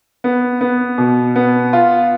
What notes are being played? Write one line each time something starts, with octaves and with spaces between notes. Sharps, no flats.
B3
B3
B2
B3
F4